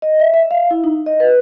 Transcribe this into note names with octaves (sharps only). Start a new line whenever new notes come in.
D#5
E5
E5
F5
E4
D#4
D#5
B4